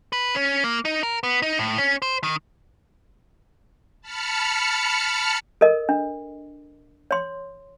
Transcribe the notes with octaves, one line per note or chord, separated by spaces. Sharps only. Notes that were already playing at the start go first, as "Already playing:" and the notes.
B4
C#4
A#3
D#4
A#4
B3
D#4
A2
C#4
C5
D#3
A5 B5 F6 C#7
A4 A#4 D#5
D4
C#5 C6